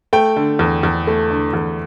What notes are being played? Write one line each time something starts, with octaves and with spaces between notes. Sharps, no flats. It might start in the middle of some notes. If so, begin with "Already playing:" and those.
A3 G5
D3
E2
E2
A3
D3
E2